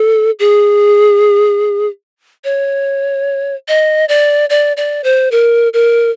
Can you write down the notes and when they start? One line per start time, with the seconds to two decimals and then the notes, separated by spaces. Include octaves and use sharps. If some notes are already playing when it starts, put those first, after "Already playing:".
Already playing: A4
0.39 G#4
2.44 C#5
3.68 D#5
4.09 D5
4.50 D5
4.77 D5
5.04 C5
5.32 A#4
5.74 A#4